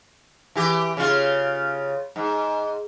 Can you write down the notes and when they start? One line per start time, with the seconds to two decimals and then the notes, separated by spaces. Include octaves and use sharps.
0.55 E3 G4
0.97 C#3 F4
2.16 G#2